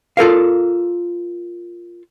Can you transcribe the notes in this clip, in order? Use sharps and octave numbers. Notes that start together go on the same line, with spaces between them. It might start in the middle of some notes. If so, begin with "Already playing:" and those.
F4 A4 A#4 F5